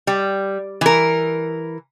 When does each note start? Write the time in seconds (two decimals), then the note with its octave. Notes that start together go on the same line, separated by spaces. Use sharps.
0.07 G3
0.81 E3 A#4